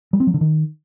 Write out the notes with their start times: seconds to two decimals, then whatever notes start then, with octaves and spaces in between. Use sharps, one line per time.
0.13 G3
0.20 C4
0.27 F#3
0.34 D3
0.41 D#3